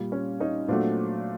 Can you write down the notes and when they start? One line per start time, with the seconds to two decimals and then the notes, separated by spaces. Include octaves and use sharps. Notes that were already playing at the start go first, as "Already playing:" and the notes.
Already playing: A#2 G3
0.12 C#4
0.40 C#4 D#4
0.68 A#2 F#3 A3 C4 D4